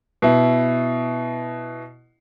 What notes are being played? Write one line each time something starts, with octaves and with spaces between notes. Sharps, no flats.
B2 E4